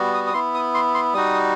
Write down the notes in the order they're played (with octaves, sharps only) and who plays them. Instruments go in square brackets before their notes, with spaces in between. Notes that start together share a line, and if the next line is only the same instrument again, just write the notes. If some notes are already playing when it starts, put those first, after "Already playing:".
Already playing: [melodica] G3 B3 F#4
D#6
D#6
B3 E4 C6
D#6
C6
C6
G3 D#4 F#4 D#6